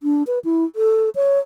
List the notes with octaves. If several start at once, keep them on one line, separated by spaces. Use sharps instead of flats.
D4
B4
E4
A4
C#5